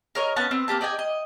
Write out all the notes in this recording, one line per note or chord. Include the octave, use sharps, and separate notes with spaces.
A#4 C#5 D#5
B3 C#4 F#5 A5
B3 C4
A#3 F#4 G4 A5
D5 D#5 G5 G#5
D#5